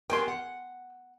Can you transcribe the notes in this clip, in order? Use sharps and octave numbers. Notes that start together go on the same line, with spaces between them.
B3 G4 A#4 G5 G#5 C6
F#5